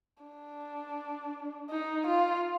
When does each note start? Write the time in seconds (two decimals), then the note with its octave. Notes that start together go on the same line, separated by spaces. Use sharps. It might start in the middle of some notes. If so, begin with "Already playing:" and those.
0.23 D4
1.70 D#4
2.06 F4